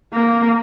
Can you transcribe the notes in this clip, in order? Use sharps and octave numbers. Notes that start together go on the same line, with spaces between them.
A#3